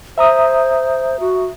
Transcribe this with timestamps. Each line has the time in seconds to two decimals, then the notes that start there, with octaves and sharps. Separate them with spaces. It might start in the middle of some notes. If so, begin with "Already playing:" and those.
0.18 C5 E5 A#5 D#6
1.20 F#4